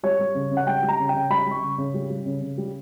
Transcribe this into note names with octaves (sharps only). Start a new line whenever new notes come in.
G3 C#5
G3
C#3
C#3
F#5
G3 G5
G3
A#5
C#3
G5
C#3
G3 B5
G3
C#6
C#3
C#3
G3
G3
C#3
C#3
G3